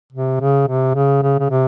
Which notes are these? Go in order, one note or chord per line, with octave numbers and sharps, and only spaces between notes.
C3
C#3
C3
C#3
C#3
C#3
C3